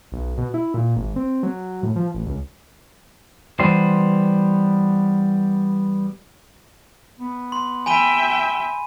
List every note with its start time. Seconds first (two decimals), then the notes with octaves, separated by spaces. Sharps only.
0.12 B1
0.38 B2
0.54 E4
0.74 A#2
0.97 G#1
1.16 C4
1.43 F#3
1.83 A2
1.96 F3
2.14 A1
2.26 C#2
3.60 E3 G3 B3 C5
7.19 B3
7.52 C6
7.86 E5 G5 G#5 B5 D#7